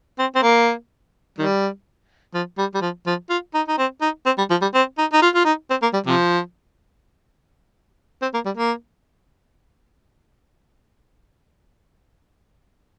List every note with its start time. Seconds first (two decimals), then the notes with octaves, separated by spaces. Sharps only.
0.18 C4
0.35 C4
0.43 A#3
1.38 D#3 G3
2.34 F3
2.58 G3
2.74 G3
2.81 F3
3.06 F3
3.30 F4
3.54 D#4
3.68 D#4
3.78 C4
4.01 D#4
4.26 C4
4.38 G3
4.50 F3
4.62 G3
4.74 C4
4.98 D#4
5.13 D#4
5.22 F4
5.35 F4
5.45 D#4
5.70 C4
5.82 A#3
5.93 G3
6.06 C3 F3
8.22 C4
8.34 A#3
8.45 G3
8.57 A#3